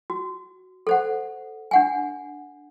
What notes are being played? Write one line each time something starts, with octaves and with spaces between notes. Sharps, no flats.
F#4
A4 C5 F#5
D4 F#5 G#5